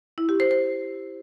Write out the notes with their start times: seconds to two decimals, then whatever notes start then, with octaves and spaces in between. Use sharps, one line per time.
0.18 E4
0.29 G4
0.40 C5
0.51 C5